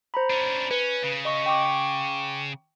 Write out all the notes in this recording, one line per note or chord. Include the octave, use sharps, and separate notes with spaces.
C5 A#5 B5
C#4 D4
C#4 B4
C#3
D#5 C#6
G5 C#6 D6